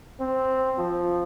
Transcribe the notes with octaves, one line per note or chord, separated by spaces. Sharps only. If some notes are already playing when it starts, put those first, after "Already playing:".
C4
F3